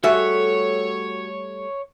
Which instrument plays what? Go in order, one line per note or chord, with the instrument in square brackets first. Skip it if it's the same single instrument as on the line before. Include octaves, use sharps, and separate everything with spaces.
[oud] G3 A3 G#4 [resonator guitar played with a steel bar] F#4 E5 [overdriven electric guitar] C#5